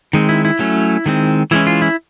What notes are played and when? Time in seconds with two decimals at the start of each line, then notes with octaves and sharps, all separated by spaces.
0.13 D#3 G#3 C4
0.29 E4
0.45 E4
0.59 F#3 A3 C#4
1.06 D#3 G#3 C4
1.51 E3 G#3 C#4 E4
1.67 F4
1.82 E4